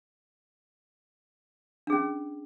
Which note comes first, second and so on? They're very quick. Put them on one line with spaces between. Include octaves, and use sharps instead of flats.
D4 G#4 C#4